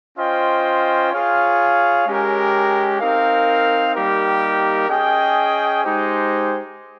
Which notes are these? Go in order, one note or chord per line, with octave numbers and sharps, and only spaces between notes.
C#4 F4 C5 D#5 G5
F4 G#4 C#5 F5
G#3 C#4 G4 A#4
C4 D#4 A#4 F5
G3 A#3 D#4 G4 A#4
C#4 G#4 D#5 G5
G#3 D#4 G4 C5